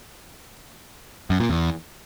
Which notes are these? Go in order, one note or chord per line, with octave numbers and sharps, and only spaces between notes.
F#2
A#2
E2